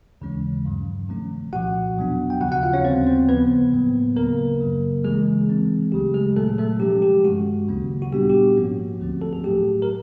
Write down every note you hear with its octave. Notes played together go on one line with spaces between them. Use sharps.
D#2 C#3 E3 G#3 C#4
G2 D#3 F#3
C3 F3 A3 C#4
C2 A#2 F3 F#4 F#5
E2 B2 F#3 B3 D4
G5
D#2 C#3 F3 F#4 F#5
F#4 F#5
F4 F5
C#4 C#5
D#2 D3 G3 B3 C4 C5
C4 C5
F2 C#3 F3 B3 B4
A2 F#3 A#3
D2 C#3 F#3 A#3 A#4
F#2 C#3 F#3
D2 C#3 E3 G#3 G#4
C3 E3 G#3 C4
D2 C#3 F#3 A3 G4
G#3 G#4
A#2 F#3 A3 A4
A3 A4
C3 F3 G#3 C#4 G4
G4
G2 D#3 G#3 F#4
D2 C#3 F#3 A#3 C#4
F#4
A#2 G3 B3 D4 G4
G4
F#4
G#2 F3 A#3 C#4
D2 D3 F3 A3 C4
A4
G#4
A2 F#3 A3 G4
A#4